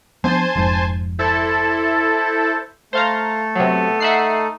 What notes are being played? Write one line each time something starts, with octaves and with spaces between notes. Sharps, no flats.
F3 B3 D4 C5 G#5 A5
F1 F2 G#2
E4 A4 C5 D5
A3 A4 C5 F5 A#5
C3 F#3 B3
D#4 E5 F#5 C7